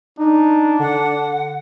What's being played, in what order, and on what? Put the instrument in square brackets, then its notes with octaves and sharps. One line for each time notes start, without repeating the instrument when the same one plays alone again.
[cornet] D4 [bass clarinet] D#4
[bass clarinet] D3 [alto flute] F#5